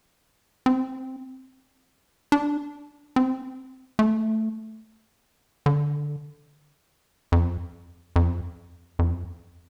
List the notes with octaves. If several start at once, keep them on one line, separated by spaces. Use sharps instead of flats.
C4
D4
C4
A3
D3
F2
F2
F2